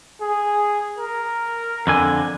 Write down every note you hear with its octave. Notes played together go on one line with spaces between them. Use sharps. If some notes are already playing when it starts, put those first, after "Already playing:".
G#4
A#4
F2 D3 G#5